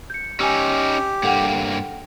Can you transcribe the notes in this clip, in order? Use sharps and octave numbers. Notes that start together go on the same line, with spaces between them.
G6 C#7
C#4 D#4 G4 G#5 E6
G2 A#3 A4 F#5 G5